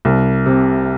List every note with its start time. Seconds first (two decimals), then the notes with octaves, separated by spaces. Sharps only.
0.05 C2
0.46 C3